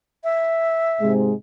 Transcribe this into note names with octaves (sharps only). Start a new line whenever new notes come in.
E5
G#2 C3 G#3